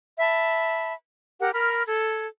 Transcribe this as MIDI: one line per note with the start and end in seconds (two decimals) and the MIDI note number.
0.19 0.94 76
0.19 0.94 81
0.19 0.94 83
1.40 1.52 67
1.40 1.52 70
1.40 1.52 78
1.53 1.83 70
1.53 1.83 83
1.53 1.83 89
1.87 2.27 69
1.87 2.27 92